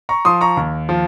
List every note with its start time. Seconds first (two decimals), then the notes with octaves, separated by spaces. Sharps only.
0.09 A#5 C#6
0.25 F3 C6 D#6
0.41 A#5 C#6
0.57 D#2
0.89 F3